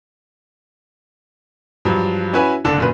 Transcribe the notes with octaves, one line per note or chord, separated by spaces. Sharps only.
G2 F3 F#3
C#4 E4 F#4 B4 E5 G#5
F#1 D3 D4 A4
F#2 A#2 B4